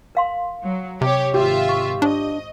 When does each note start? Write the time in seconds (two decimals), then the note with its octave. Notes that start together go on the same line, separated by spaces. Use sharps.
0.15 A#4 F5 C6
0.63 F#3
1.01 C3 G4 C#5
1.34 G#1 F4 G4 E5
1.69 C#6
2.02 D4 C5 D#5